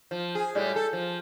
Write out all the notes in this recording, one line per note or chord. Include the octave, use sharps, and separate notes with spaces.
F3
G#4
A2 G3 G#3
A4
F3